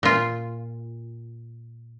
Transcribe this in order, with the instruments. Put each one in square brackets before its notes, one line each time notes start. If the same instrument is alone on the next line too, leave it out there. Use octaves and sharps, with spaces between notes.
[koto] A#2 F4